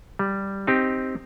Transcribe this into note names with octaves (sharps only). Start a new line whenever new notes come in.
G3
C4 D#4 G4